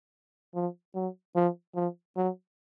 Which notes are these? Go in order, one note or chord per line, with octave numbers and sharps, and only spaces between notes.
F3
F#3
F3
F3
F#3